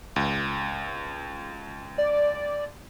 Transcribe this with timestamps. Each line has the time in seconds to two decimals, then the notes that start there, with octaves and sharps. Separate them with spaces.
0.16 C#2
1.98 D5